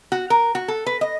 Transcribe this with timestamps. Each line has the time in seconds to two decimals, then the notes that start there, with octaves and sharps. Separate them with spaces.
0.12 F#4
0.30 A#4
0.55 F#4
0.68 A4
0.86 B4
1.01 D#5